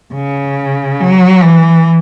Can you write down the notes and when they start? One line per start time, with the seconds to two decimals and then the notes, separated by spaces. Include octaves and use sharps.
0.14 C#3
1.00 F#3
1.43 E3